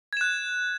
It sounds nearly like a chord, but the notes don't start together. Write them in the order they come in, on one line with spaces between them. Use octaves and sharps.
G#6 E7 F#6